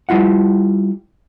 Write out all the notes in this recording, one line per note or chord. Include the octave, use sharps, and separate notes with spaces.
G3 E4 F4 F#5